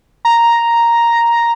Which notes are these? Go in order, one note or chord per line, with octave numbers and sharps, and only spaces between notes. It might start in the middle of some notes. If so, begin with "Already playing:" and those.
A#5